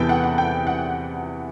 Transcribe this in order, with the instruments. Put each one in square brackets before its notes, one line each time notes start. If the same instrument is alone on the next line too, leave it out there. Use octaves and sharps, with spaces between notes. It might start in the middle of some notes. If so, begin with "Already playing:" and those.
Already playing: [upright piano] E2 C3 E3 B3 E4 [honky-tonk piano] A4 B4 G5
[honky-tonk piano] F#5
F#5
G5
F#5